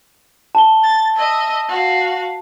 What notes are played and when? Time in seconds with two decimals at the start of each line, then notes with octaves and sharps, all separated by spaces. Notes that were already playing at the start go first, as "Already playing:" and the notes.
0.55 A5 G7
0.83 A6
1.16 D#5 E5
1.68 F#4 F5